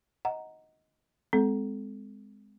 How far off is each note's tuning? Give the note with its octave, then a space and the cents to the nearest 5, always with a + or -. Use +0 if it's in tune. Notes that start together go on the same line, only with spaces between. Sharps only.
D#5 +15 F#5 +0 A#5 +0
G#3 +0 C4 -25 A4 -20